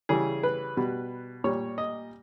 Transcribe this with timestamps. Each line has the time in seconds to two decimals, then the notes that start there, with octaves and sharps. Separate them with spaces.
0.09 C#3 E3 G3 G#4
0.43 B4
0.77 B2 G3
1.44 A#2 G3 C#5
1.78 D#5